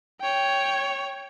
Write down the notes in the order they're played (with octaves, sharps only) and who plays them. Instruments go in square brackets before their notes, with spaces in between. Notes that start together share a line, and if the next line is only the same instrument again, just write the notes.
[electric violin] C#5 G5